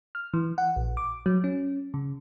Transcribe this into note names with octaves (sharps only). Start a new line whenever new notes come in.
F6
E3
F#5
A#1
D6
F#3
C#4
C#3